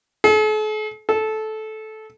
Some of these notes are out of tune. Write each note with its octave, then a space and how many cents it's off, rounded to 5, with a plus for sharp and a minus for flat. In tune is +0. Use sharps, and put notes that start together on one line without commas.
A4 -45
A4 -15